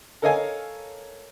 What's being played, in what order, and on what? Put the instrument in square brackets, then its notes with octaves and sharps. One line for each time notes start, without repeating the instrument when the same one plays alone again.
[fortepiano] A4 A#4 C#5 D#5 F5 G#5